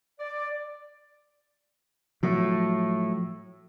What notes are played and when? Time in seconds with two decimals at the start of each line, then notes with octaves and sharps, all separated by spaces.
0.19 D5
2.23 A2 F3 F#3